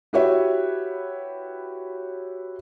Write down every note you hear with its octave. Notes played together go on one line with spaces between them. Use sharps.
E4 F#4 G4 B4 C#5 E5